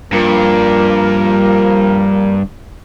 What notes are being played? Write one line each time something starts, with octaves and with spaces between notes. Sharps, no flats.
G2 F3 A#3 A#4